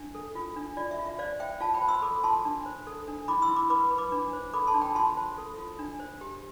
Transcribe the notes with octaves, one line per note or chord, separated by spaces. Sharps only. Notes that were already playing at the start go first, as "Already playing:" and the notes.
Already playing: D4
A4
F4
D4
F4 D5
E5
F4
E5
C5 D5 F5
C5 E5 G5
F4 F5 A5
G5 B5
C5
C6 E6
A4 B5 D6
F4 A5 C6
D4
C5
A4
D4
E4 B5 D6
C6 E6
E4
B5 D6
B4 B5 D6
B4
B5 D6
D4
C5
A4 B5 D6
A5 C6
D4
G5 B5
F4 A5 C6
C5
A4
F4
D4
C5
G4